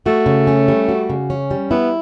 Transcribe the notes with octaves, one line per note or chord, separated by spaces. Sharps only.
A3 F#4
C#3
C#4
G3
F#4
C#3
C#4
G3
B3 E4